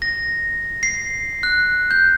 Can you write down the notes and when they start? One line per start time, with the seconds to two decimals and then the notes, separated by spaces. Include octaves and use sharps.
0.02 A#6
0.83 C7
1.43 F#6
1.91 G6